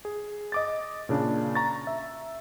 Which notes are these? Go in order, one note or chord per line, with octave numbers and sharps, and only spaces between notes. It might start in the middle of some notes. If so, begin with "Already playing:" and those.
G#4
D#5 D6 A6
A#2 C#3 D4
A#5 C#6 A6
E5